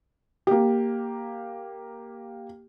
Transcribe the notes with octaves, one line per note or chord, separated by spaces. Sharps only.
A#3 G4